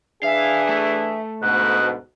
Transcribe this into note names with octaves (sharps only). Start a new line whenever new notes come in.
E3 D4 G#4 E5 F5
A3
D2 G#2 B2 F#6